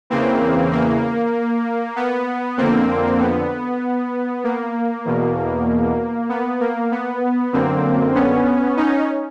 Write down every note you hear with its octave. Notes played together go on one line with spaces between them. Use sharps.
E2 C#3 E3 A#3 C4
A#3
B3
F2 D3 A#3 C4
B3
A#3
E2 B2
B3
A#3
B3
F#2 D3 A#3 C4
B3 C#4
C#4 D#4